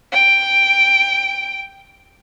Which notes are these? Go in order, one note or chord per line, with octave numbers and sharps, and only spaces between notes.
G5 D7